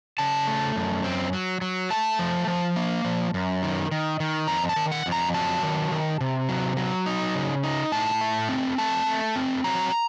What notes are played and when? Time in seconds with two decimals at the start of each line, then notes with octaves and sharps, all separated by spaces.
0.18 C#3 A5
0.47 A3
0.76 F#2
1.04 C4
1.33 F#3
1.61 F#3
1.90 A3 A5
2.19 F3
2.47 F3
2.76 A#3
3.05 F3
3.34 F#2
3.63 D#3
3.91 D#3
4.20 D#3
4.48 F2 A#5
4.69 A5
4.76 D#3
4.92 F#5
5.06 F2
5.12 A#5
5.34 F#3 A5
5.63 D#3
5.92 D#3
6.21 C3
6.49 F#3
6.77 F#3
7.06 D#4
7.35 C#3
7.63 D#4
7.92 A2 A5
8.21 A3
8.49 C4
8.78 A3 A5
9.07 A3
9.36 C4
9.64 F#3 A#5